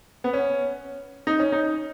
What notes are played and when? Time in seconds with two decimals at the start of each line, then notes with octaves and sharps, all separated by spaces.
0.24 B3
0.33 C#4
1.27 D#4
1.40 C#4
1.52 D#4